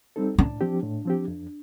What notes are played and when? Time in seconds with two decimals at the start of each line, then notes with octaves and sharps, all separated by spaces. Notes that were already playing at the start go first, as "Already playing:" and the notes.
0.16 G3 C4 D#4 A4
0.38 A2 D4
0.61 F3 C4 G4
0.83 A2
1.05 F3 C4 G4
1.28 F2